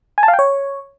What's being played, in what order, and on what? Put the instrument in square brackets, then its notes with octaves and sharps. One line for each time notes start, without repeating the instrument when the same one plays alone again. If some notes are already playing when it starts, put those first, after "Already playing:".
[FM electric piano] G#5
A5
F5
G5
C#5